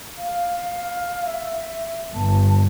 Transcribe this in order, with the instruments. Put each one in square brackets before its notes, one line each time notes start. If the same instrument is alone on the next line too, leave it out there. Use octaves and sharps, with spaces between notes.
[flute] F5
E5
[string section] G1 [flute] A5